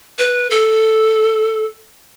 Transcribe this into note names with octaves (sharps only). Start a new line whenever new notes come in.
B4
A4